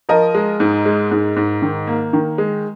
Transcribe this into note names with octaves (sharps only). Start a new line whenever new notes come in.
F3 A#4 D#5
G#3
G#2
G#3
G#2
G#2
D#3
A#3
D#3
G#3